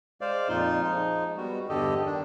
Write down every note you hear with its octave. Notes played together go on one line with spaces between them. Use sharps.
G#3 C5 D5 F5
F2 A#2 D#4 F4 C6
F3 G#3 D#4
G3 G#3 B3 F#4
E2 G2 D3 G4 A4 D#5
D#3 D4